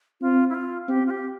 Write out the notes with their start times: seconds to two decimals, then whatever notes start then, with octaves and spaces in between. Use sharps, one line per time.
0.21 C4 F4
0.50 E4
0.54 F4
0.88 C4 G4
1.07 F4
1.10 G4